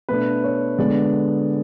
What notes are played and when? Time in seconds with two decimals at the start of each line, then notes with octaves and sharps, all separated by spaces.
0.09 B2 A3 D4 B4
0.44 C#5
0.78 D3 G#3 B3 D4 D5